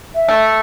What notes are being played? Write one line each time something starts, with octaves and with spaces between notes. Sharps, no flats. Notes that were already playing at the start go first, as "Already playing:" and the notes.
E5
A3